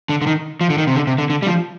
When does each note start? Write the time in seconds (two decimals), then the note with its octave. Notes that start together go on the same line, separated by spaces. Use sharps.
0.09 D3
0.22 D3
0.27 D#3
0.61 F3
0.70 D3
0.78 D#3
0.87 C3
0.95 D3
1.07 C3
1.18 D3
1.30 D3
1.42 G3
1.47 F3